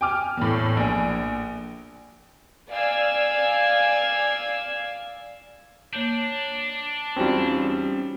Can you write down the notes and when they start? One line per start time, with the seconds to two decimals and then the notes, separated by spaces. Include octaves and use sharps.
0.01 G5 G#5 D6 F6
0.37 E2 A2
0.77 A#1 G#5
2.71 D5 F5 G#5 E6 G#6
5.93 A#3 D4 C#5 G6
7.16 E2 G3 C4 C#4 D#4 F4 F#4